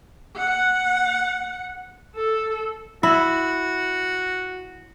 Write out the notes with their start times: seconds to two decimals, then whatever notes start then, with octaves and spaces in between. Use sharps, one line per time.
0.37 F#5
2.16 A4
3.03 E4 F#4